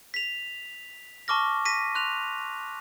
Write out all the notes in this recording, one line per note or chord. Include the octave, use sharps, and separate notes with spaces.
B6 F7
A5 C#6 D6 F6 A#6
A#6 B6 D#7
C6 F#6 F7